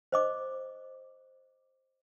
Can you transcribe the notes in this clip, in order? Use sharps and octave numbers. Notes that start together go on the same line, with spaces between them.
C5 D#5 D6